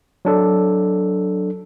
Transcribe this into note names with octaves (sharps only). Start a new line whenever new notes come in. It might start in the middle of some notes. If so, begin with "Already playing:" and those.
F#3 D4 A4